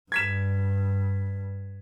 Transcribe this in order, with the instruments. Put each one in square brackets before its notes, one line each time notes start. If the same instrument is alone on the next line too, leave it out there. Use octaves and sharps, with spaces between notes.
[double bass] G2 [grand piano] G#6 B6 E7